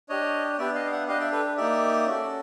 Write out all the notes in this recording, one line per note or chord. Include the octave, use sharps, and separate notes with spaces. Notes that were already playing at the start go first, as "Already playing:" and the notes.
D4 G4 C#5 D#5
B3 D4 G4 D5 E5
D#5 F5
F5
E5 F#5
D4 G4 D#5 F5
D5 E5
A4 B4
A#3 D#4 G4 D5 E5
C#4 F#4 A4